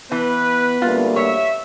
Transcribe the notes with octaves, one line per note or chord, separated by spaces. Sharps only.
E3 B3 B4
D2 G3 A#3 F4
C#5 E5